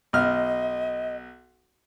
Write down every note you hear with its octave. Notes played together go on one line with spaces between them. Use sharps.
B1 D#5 F6